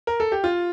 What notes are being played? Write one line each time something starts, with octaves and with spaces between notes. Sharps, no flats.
A#4
A4
G4
F4